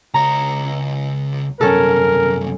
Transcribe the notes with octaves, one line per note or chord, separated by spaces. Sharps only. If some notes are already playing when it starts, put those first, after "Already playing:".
C#2 C#5 A#5
C2 F#2 C#4 A4 A#4